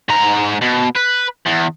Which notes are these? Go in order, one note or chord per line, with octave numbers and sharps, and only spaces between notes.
G#2 A#5
B2
B4
E2